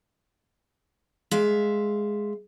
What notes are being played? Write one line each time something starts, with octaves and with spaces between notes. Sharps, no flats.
G#3 E5 F5